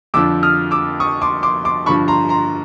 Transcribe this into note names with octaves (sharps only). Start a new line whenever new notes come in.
F2 D3 F3 D6 E6
D#6 F6
D6 E6
C#6 D#6
C6 D6
C6 D6
C6 D6
G2 D3 F3 B5 C#6
A#5 C6
A#5 C6